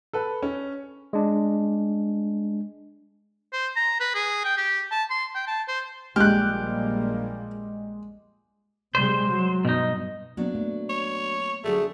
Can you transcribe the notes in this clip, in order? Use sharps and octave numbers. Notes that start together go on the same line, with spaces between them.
A4 B4
C#4
G#3 D4
C5
A#5
B4
G#4
G5
G4
A5
C6
G5
A5
C5
A#1 G3 G#3 A#3 G4 F6 F#6
C3 G3 G#3 C5
F#3
G2 B2 D#4
F#3 A#3 B3 D4
A3
C#5
D3 F#3 G3 A3 G#4